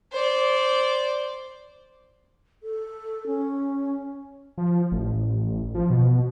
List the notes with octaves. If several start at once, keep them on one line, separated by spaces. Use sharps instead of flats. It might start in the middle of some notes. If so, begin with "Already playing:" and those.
C5 D5
A4
C#4
F3
A1
F3
B2